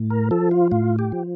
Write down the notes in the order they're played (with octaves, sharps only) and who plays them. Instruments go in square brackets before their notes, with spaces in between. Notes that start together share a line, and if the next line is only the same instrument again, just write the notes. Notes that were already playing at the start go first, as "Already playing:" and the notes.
Already playing: [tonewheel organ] A2
A#4
F3 A4
F4
A2 F4
G4
F3